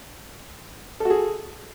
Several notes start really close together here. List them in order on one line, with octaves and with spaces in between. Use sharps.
A4 F#4 G#4